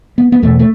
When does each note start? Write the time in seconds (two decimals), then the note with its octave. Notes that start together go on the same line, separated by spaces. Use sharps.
0.18 B3
0.32 B3
0.42 E2 B2 A3
0.59 A3